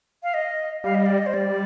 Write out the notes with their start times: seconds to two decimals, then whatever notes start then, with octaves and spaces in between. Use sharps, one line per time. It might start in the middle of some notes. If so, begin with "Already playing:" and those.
0.23 F5
0.34 D#5
0.84 G3 F5
0.95 D#5
1.06 D5
1.18 D#5
1.26 C5
1.34 G3 D5